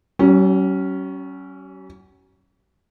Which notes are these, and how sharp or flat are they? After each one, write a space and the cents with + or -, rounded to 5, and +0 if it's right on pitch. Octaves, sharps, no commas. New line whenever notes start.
F#3 +45 C#4 +0